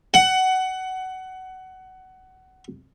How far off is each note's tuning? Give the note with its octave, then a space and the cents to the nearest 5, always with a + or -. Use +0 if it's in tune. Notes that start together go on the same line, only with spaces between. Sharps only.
F#5 +20